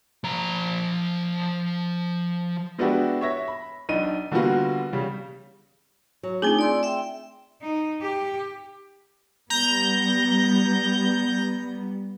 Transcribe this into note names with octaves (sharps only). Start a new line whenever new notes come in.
F3 A#5
G#3 B3 D4 E4 F#4 G4
C#5 E5 A#6
B5
B1 D4 D#4 D#7
D3 G3 A#3 B3 F4 F#4
C#3 G3
F#3
A3 C4 D4 D#4 F4 G#4 G#5
D5 C6 E6
E5 G5
D#4
G4
G3 B3 A#5 G6